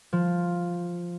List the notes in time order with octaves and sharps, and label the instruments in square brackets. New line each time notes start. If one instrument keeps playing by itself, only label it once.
[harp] F3